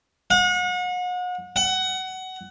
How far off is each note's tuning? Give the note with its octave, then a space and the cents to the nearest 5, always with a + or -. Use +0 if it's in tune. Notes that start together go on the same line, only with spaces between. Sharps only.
F#5 -40
F#5 +20